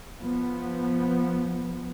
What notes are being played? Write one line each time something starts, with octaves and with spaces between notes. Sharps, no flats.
F3 B3